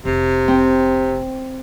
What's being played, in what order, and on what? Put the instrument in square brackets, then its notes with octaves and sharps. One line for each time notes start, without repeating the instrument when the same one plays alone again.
[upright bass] F1 [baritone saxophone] C3
[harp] C4